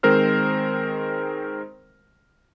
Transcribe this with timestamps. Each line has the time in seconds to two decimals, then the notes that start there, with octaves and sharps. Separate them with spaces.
0.03 D#3 G#3 C4 A#4 C5 F6